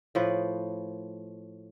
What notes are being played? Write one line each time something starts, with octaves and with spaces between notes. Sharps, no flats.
A2 F3 B4